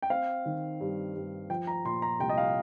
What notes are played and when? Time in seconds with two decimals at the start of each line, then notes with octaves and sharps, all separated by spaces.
0.02 G5
0.10 C4 F5
0.45 D#3
0.80 G2
1.15 G2
1.50 F3 G5
1.67 A#5
1.85 A#2 C6
2.02 A#5
2.19 C2 G5
2.29 D#5
2.38 F5